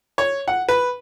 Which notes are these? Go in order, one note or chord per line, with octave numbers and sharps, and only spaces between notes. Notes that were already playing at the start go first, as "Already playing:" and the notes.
C#5
F#5
B4